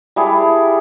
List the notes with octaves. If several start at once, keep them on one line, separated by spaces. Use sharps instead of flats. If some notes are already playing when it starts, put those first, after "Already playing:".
G3 E4 G#4 A4